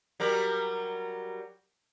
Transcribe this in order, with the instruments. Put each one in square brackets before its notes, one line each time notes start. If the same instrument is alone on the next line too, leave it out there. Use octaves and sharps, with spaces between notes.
[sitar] F#3 G3 A#4